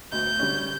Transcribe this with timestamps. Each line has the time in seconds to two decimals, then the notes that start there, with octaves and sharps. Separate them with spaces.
0.12 D2 G6
0.39 D3 G3 C#4